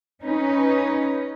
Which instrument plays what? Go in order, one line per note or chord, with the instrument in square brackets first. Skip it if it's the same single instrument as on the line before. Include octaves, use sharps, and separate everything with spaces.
[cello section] C#4 D#4 B4